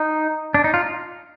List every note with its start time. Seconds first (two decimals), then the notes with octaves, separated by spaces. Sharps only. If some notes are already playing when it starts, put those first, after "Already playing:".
Already playing: D#4
0.54 D4
0.64 D#4
0.74 F4